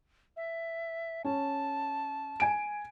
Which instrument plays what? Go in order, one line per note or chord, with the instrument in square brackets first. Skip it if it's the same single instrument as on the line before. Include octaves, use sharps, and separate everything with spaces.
[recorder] E5
[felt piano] C#4 [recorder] A5
[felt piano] G#5 D7